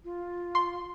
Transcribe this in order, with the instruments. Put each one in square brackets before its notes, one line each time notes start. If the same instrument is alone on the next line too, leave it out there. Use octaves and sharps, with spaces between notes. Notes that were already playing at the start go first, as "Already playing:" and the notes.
[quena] F4
[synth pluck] C6